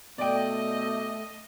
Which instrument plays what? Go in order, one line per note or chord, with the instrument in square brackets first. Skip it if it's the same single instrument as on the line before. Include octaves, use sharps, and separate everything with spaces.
[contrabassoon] B2 [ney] A3 [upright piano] D5 G5 [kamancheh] D#5